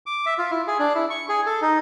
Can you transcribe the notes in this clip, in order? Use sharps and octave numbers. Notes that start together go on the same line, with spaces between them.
D6
E5
F4
E4
G#4
D4
E4
C#6
G#4
A4
D#4